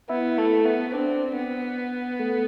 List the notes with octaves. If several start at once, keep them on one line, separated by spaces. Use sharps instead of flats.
B3 E4
A3
B3
C4 D4
B3
A3